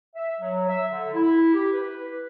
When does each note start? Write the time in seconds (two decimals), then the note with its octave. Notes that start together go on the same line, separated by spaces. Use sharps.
0.15 E5
0.41 F#3
0.68 E5
0.91 D3
1.13 E4
1.53 G4
1.73 B4